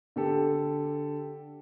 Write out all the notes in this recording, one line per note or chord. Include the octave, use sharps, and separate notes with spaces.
D3 G4 A4